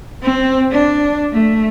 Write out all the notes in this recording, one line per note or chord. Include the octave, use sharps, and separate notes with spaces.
C4
D4
A3